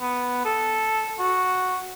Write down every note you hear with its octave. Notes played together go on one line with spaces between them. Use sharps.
B3
A4
F#4